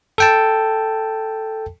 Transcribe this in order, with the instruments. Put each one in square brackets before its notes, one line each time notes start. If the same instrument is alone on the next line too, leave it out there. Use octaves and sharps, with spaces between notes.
[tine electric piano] A4 G5 A5